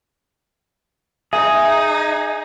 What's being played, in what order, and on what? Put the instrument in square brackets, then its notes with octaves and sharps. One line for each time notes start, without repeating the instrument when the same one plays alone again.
[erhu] D#4 [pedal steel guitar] G#4 [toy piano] E5